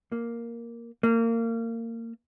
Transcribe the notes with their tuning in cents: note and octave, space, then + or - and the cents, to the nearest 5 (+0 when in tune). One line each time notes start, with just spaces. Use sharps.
A#3 +0
A#3 -25